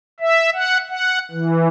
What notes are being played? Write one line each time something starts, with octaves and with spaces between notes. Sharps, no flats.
E5
F#5
F#5
E3